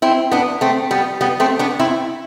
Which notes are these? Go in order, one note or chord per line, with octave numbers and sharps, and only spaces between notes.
C4 E4
B3 D4
A3 C4
G3 B3
G3 B3
A3 C4
B3 D4
C4 E4